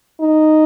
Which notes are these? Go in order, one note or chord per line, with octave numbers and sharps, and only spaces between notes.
D#4